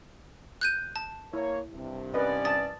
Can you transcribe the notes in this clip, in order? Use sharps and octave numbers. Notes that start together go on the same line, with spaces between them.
F#6 G6 D#7
A5
A#3 E4 C#5
C2 G2 C3
B3 C#4 A#4 B4 D5 D#5
A5 D#6 A6